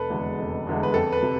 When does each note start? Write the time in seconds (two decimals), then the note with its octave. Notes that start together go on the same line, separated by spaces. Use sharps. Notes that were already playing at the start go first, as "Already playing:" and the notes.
Already playing: F1 A4 B4
0.10 E2 D3 G#3
0.38 F1
0.67 E2 D3 G#3
0.83 B4
0.94 F2 A4
1.12 B4
1.23 C3